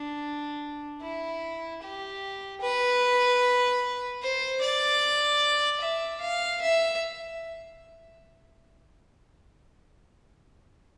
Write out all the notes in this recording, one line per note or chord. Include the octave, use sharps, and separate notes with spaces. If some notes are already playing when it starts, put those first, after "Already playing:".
Already playing: D4
E4
G4
B4
C5
D5
E5
F5
E5